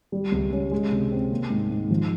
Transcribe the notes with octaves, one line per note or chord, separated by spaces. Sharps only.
G3
C#2
C#4
G#3
C3
C4
A#3
G#2
G#2
F3